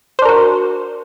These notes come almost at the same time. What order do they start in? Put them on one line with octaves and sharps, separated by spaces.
C5 D4 A#4 F#4